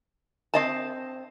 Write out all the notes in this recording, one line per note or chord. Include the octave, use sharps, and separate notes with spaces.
C4 D#5 A5